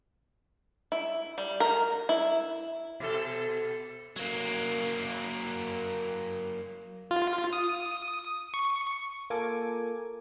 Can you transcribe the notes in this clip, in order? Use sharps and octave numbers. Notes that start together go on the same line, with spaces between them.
E4
G3
A#4
E4
B2 A4
F#3 A#3
F4
D#6
C#6
A#3 F4 A4 A#4 G#5 D6